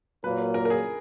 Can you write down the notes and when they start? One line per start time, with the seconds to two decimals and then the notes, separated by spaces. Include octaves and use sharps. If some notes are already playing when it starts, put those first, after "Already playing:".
0.24 A#2 F#3 A#3 B4
0.54 A#4
0.65 A#4
0.70 G#4